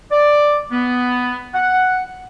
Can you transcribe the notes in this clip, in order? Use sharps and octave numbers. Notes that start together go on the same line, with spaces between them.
D5
B3
F#5